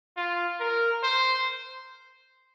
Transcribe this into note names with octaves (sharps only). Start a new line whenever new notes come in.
F4
A#4
C5